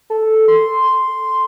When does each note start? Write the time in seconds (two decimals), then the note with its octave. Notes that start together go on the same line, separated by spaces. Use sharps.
0.10 A4
0.48 C6